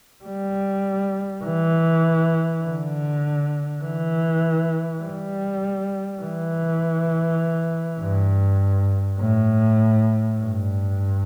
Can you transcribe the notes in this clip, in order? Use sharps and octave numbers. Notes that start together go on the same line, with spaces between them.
G3
E3
D3
E3
G3
E3
G2
A2
G2